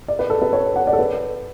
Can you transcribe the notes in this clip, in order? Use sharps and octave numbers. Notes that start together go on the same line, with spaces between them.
D5
B4
A4
B4
C#5
F#5
D5
A4
B4